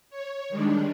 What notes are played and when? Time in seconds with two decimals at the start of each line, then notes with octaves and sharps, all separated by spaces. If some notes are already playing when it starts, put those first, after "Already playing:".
0.10 C#5
0.49 D#3 G3 G#3 D4